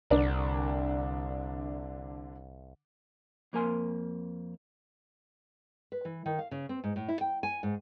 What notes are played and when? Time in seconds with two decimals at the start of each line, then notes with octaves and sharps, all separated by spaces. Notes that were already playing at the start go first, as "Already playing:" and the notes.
0.10 C2 D3 D4 A#4
3.53 F2 A#3 A#4 G#5 C6
5.92 B4
6.05 E3
6.26 D#3
6.39 F5
6.51 C#3
6.69 C4
6.84 G#2
6.96 A2
7.09 E4
7.21 G5
7.43 G#5
7.63 G#2